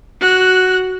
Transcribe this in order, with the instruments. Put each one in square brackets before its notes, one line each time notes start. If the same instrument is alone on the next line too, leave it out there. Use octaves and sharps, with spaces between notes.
[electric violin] F#4 F#6